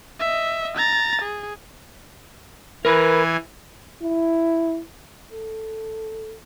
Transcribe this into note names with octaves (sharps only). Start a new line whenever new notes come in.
D#5 E5
A#5 A6
G#4
E3 A#4 B4 G#5
E4
A4